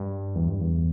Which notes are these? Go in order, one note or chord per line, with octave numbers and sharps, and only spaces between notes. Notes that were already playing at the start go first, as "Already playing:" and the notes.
Already playing: G2
E2
G2
E2